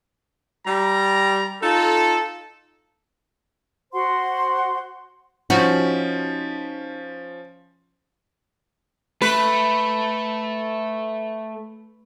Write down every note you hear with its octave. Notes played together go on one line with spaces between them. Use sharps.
G3 A#5
D#4 F4 A4
F#4 C5 F#5 C6
F3 C#4 D#4 F#4
A3 B4